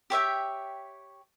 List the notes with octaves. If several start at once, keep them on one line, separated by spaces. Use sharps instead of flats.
G4 C#5 E5 G5